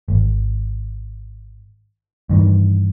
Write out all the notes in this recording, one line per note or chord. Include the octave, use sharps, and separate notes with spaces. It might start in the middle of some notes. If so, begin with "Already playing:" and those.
G#1
G2 D#3 E3